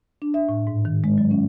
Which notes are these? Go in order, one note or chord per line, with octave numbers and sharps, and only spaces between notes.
D4
E5
A2
G#2
D#3
G#3
F#3
C#4